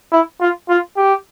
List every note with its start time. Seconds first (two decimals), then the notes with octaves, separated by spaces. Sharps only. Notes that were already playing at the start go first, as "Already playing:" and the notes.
0.12 E4
0.40 F4
0.69 F4
0.97 G4